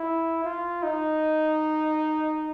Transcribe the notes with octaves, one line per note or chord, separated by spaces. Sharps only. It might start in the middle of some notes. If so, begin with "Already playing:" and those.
Already playing: E4
F4
D#4